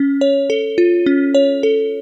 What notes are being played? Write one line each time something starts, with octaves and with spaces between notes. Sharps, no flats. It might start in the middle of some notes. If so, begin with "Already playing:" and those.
Already playing: C#4
C#5
A4
F4
C#4
C#5
A4